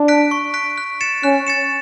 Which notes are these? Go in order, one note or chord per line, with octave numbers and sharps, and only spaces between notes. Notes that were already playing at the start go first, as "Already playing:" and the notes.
Already playing: D4
F#6 B6 D7
C#6
F#6 B6 D7
F#6
A6 C#7 E7
C#4 F#6
A6 C#7 E7